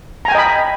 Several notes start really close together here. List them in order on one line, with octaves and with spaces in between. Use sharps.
A#5 G#5 G5 D#5 B5